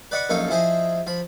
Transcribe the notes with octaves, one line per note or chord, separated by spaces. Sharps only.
B4 D5 D#5 F#5 B5 C#6
A#1 F#2 D#4 A4 C#5 F5
F3 E4 G#4 C5 D#5
F3 B5